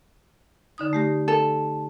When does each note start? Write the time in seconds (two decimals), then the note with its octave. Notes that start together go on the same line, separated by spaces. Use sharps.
0.78 D3 D#4 D#6
0.93 A3 G4 A#6
1.28 A4